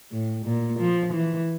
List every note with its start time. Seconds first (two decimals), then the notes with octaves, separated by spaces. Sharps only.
0.11 A2
0.45 A#2
0.79 F3
1.13 E3